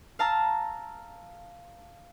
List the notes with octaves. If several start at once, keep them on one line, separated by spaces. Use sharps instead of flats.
F5 A5 A#5 E6